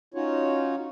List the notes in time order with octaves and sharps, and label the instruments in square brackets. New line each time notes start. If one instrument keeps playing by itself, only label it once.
[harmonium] C#4 D#4 F4 F#4 C#5